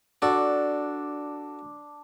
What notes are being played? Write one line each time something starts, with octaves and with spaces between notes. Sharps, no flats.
D4 F#4 A4 D5